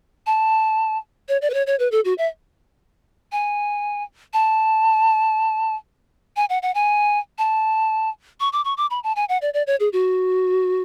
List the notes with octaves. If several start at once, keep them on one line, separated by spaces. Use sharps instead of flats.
A5
C#5
D5
B4
C#5
C#5
B4
A4
F#4
E5
G#5
A5
G#5
F#5
F#5
G#5
A5
C#6
D6
C#6
D6
B5
A5
G#5
F#5
D5
D5
C#5
G#4
F#4